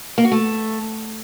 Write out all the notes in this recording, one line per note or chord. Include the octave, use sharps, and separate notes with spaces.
A#3
F#4
A3